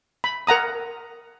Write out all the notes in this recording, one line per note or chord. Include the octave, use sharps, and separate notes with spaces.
B5
A#4 F#5 A#5 D#6